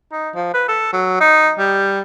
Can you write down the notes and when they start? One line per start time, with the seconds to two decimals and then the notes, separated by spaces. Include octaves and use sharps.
0.12 D#4
0.35 F3
0.54 B4
0.68 A4
0.93 F#3
1.20 D#4
1.59 G3